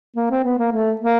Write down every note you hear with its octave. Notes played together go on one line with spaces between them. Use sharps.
A#3
C4
B3
A#3
A3
A#3